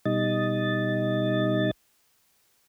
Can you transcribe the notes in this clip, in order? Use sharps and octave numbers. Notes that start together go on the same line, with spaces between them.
B2 G3 D#4 D#5 A6